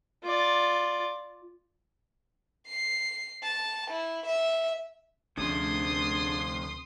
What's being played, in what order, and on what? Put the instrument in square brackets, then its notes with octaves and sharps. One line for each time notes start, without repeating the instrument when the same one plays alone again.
[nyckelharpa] F4 D5
[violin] C7
A5
E4
E5
[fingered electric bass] D2 C#4 [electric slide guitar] C3 F3 [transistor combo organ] D4 G#4 [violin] C6 D#6